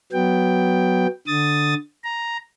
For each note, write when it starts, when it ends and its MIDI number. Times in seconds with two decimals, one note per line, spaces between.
0.12 1.07 54
0.12 1.07 59
0.12 1.07 79
1.27 1.74 50
1.27 1.74 87
1.27 1.74 93
2.04 2.37 82